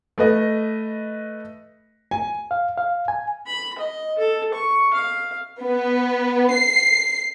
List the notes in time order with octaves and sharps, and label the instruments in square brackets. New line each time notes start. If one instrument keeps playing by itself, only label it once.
[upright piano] A3 B4 D#5
G#5
[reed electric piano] F5
F5
G#5
[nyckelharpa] B5
D#5
A4
C#6
F5
[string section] B3
C7